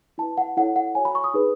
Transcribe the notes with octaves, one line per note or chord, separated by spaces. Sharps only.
E4 B4 A5
F#5
E4 A4 C#5 F#5
F#5
F#4 C#5 G#5
B5
C#6
D#6
D#4 G#4 B4